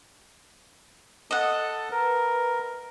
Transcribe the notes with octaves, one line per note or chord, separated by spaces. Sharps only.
A4 D#5 F#5 A5
A#4 B4